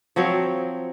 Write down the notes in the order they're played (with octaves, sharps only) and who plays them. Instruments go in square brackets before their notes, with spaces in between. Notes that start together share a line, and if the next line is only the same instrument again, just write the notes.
[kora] F3 F#3 C4 C#5